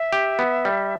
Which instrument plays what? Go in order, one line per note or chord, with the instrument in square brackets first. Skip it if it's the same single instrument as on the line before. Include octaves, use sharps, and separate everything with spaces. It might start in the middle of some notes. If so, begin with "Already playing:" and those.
Already playing: [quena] E5
[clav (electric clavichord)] G4
B3
G3